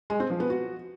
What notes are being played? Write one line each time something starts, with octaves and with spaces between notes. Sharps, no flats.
G#3
C4
F3
B3
F#4